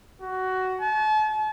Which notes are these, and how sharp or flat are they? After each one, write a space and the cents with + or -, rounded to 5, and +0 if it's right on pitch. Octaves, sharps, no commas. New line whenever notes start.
F#4 +15
A5 -40